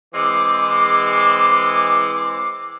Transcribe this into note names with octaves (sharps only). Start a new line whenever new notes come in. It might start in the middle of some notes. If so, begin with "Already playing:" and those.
E3 G#3 C4 D6